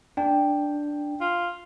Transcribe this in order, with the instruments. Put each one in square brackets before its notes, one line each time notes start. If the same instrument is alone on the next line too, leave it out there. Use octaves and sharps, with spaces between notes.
[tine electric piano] D4 [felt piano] G5
[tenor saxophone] F4